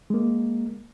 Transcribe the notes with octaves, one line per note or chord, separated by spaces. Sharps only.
G#3 A#3